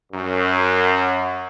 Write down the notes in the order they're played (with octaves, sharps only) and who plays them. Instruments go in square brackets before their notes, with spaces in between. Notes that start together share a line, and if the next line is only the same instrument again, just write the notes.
[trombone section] F#2